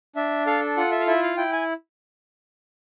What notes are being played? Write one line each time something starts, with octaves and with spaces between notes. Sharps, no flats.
D4 E5
A4 F5
F4 F#5
E5
F5
E4 E5
F5
E4 G5
G#5